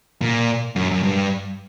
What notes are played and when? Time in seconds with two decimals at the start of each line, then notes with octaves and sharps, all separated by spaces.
0.21 A#2
0.76 F#2
0.91 F#2
1.03 G2